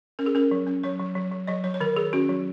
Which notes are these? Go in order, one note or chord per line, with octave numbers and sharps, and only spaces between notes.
C#4 A#4
G#4
C#4 A#4
F#3
C#4
F#3 C#5
F#3
F#3
F#3
F#3 D#5
F#3 C#5
C#5
D#3 A#4
D#3 G#4
C#4 F#4
F#3